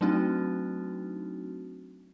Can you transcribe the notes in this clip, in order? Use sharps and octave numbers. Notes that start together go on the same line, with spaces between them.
F#3 A3 C4 D4 D#4 F#4